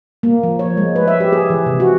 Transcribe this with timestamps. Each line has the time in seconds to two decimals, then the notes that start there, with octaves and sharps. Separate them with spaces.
0.23 A#3
0.43 F3
0.59 C#5
0.77 G#3
0.96 B4
1.08 E5
1.20 G4
1.33 G#4
1.50 E3
1.66 C3
1.80 F#4